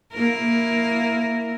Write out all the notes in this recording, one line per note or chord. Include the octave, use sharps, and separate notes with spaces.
A#3 E4 A#4